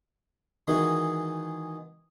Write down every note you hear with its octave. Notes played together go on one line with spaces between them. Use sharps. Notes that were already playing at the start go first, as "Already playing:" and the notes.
D#3 E3 G#3 D#4 F#4 G#4